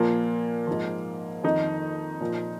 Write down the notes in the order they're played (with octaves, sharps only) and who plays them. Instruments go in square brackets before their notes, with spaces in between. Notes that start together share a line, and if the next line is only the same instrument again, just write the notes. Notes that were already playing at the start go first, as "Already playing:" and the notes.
Already playing: [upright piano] A#2 F3 A#3
G#2 F3
F2 D#3 D#4
A#2 F3